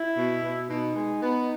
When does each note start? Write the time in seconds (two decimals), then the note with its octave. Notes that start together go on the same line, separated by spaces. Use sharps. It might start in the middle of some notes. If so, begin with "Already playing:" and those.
Already playing: E4
0.18 B2
0.44 B2
0.70 B2 D#4
0.96 G#3
1.22 B3